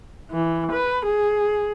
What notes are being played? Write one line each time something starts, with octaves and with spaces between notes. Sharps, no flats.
E3
B4
G#4